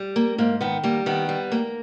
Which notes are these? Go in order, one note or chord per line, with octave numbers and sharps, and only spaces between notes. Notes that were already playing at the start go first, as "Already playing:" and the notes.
Already playing: G3
A#3
G#2 A#3
D#3 B3
G3 A#3
D#3 B3
G3
A#3